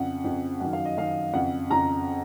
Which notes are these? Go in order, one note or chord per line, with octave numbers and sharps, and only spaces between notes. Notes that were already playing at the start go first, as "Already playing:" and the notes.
Already playing: F2 C#3 F#5
F2 C#3
F#2 D#3 F#5
F5
D#5
F#2 D#3 F5
F2 C#3 F#5
F2 C#3 A#5